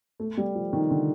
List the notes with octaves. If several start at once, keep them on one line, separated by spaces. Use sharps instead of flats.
A3
G3
F3
D#3
D3